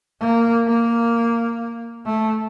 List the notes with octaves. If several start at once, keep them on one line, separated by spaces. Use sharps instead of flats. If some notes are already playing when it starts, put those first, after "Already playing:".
A#3
A#3
A3